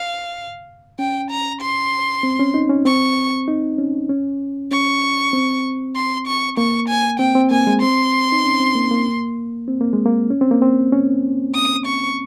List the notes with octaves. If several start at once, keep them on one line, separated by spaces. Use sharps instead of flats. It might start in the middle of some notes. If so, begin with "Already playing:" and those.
Already playing: F5
C#4 G5
A#5
C6
C4
C#4
D#4
C#4
C4 C#6
D#4
C#4
C#4
C#4 C#6
C4
C6
C#6
A#3 C#6
G#5
C4 G5
C4
A#3 G#5
G#3
C4 C6
D#4
C#4
C4
A#3
A#3
C4
A#3
G#3
A#3
C#4
C4
A#3
C4
C#4
D#6
C#6